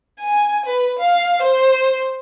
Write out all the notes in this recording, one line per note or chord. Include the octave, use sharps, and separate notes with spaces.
G#5
B4
F5
C5